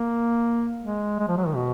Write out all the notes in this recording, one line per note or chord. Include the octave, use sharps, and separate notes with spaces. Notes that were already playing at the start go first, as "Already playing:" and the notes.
Already playing: A#3
G#3
G#3
F3
F#3
D#3
B2